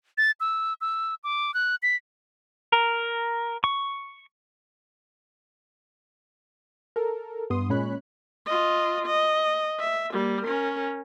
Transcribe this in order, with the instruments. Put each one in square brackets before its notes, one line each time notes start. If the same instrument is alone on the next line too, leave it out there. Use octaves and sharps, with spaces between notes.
[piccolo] A6
E6
E6
D6
F#6
B6
[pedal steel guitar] A#4
C#6
[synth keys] A4 A#4
G2 B3 C6 D#6
A#2 G#3 C#4 C#5 B5 F#6
[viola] F4 D#5
D#5
E5
G3 A#3
C#4 A#4